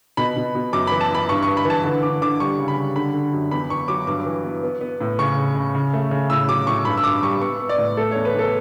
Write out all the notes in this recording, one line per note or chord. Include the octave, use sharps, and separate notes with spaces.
B2 B5
B2
B2
F#2 D6
E3 B5
A5
E3 B5
G2 C#6
G2 C#6
B5
E3 A5
D3
D3 D6
D3 D6
G3 C#6
C#3
B5
G3
D3 B5
D3
F#2
E2 B5
E2 C#6
F#3 D6
G2 D6
E3
B3
B3
B3
A2
C#3 C#6
C#3
C#3
C#3
A3
C#3
A2 E6
F#3 D6
A2 C#6
G2 B5
E6
G2 D6
G3 C#6
B3 C#6
B3
D5
A2
A3 A4
E2 C#5
B4
E2 A4